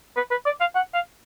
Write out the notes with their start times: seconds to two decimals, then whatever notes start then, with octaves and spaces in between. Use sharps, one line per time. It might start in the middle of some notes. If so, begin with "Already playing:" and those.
0.17 B4
0.31 B4
0.46 D5
0.60 F5
0.75 F#5
0.94 F5